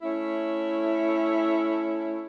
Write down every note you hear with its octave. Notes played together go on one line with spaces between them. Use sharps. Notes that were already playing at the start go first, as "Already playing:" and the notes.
A3 C#4 E4